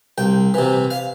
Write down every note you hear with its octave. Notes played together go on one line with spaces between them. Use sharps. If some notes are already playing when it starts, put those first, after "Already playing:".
C2 G5
C3 E3
F5